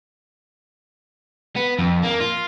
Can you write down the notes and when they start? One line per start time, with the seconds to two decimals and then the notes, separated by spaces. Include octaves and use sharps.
1.56 B3
1.79 F2
2.03 A#3
2.20 F4